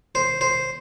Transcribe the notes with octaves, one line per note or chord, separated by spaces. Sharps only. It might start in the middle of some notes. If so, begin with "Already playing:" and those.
C5
C5